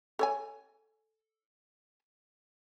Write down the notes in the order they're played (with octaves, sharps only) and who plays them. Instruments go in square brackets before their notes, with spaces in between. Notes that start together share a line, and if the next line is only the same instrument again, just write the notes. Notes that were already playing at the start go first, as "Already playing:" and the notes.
[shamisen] A4 C#5 G#5